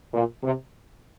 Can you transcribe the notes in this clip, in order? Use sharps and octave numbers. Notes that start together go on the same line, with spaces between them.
A#2
C3